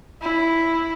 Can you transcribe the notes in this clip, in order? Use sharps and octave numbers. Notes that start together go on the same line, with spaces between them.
E4